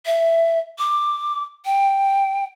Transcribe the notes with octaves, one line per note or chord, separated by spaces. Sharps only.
E5
D6
G5